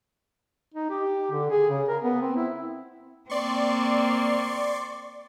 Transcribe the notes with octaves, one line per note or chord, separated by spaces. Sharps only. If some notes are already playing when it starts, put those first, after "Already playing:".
D#4
G4
D3
G#4
C#3
A#4
B3
C4
E4
A#3 C4 D5 C6 C#6